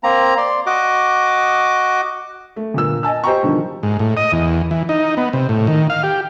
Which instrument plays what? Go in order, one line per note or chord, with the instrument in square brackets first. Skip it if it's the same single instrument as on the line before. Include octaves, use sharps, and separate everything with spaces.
[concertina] A#3 C4 A#5
D5 C6
F#4 D#5 D6
[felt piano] A3
G1 A#2 E6
D#5 G#5 A5 E6
G4 C5 D#5 G5 A#5 C#6
B2 D3 D#3 F3 G3
[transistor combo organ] G#2
A2
D#5
E2
E3
D#4
B3
C3
A2
D#3
F5
G4